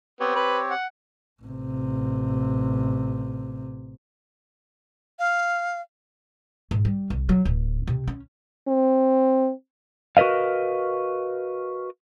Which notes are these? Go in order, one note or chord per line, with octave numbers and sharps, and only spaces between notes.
B3 C4 G4 C#5
B4
F#5
A1 C3
F5
G#2
G3
C2
F#3
D1
C3
C#4
C4
F#4 A#4 B4 D#5 F5